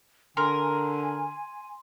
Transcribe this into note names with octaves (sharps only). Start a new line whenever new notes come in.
D3 A#4 G#5 C6